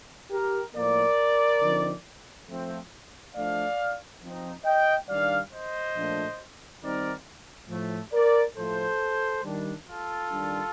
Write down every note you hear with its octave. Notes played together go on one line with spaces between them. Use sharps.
G4 A#4
A2 F3 A#3 A#4 D5
D3 F3 C4 D#4
F3 A3 C4
F3 A3 D4 D5 F5
F3 C4 D#4
D#5 G5
D#3 G3 D4 D5 F5
C5 D#5
A#2 F3 A3 D4
D#3 G3 C4 D#4 A#4 D5
A2 F3 A3
A#4 D5
A2 F3 A3 A4 C5
D#3 G3 D4
F4 A4
D#3 G3 D4